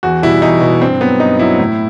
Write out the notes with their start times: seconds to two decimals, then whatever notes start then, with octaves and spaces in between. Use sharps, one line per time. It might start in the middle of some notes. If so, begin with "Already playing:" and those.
0.03 E2 F#4
0.22 B2 G3 E4
0.42 E2 D#4
0.61 B2 G3
0.81 G2 C4
1.01 F#3 B3
1.20 G2 D#4
1.39 F#3 E4
1.59 A2